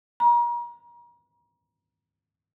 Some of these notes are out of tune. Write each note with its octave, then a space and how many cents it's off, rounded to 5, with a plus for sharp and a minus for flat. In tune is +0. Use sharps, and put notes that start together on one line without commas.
A#5 +35